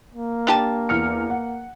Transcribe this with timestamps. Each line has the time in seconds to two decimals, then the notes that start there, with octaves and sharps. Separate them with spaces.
0.14 A#3
0.47 D4 G4 A5
0.89 E2 F6 C#7
1.30 F#5